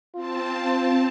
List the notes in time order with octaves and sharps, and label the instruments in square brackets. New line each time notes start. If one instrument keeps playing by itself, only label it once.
[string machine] C4 A5 [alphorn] F4